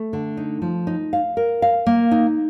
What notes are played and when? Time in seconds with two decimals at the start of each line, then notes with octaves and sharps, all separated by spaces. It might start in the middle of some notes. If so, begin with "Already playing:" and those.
Already playing: A3
0.13 D3
0.37 D#4
0.62 F3
0.87 D#4
1.13 F5
1.37 A#4
1.62 F5
1.87 A#3
2.11 D#4